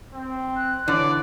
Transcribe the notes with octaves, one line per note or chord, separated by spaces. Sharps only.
C4
F#6
D3 E3 C#5 D5